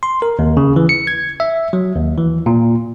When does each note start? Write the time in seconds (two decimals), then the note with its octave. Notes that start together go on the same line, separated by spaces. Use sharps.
0.03 C6
0.22 A#4
0.39 D#2
0.57 C#3
0.76 E3
0.89 C#7
1.07 G#6
1.40 E5
1.73 F#3
1.96 D#2
2.18 E3
2.46 A#2